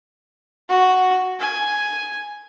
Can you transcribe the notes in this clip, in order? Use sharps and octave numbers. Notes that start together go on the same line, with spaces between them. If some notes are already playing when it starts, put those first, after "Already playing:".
F#4
G#5